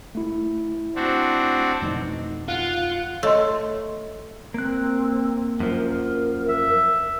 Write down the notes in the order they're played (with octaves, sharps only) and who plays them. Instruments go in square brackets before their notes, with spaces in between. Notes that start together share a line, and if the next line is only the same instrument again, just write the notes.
[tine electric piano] A3 E4
[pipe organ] C4 D4 F#4
[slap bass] F2 B2 E3 [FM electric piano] A3 D#4
[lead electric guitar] F4 [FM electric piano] F5 [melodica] F#5
[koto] A3 [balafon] C#5 D#5 C6
[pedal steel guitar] A#3 F#6 [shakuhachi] C4
[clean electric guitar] F#2 F3 [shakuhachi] A#4
[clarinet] E5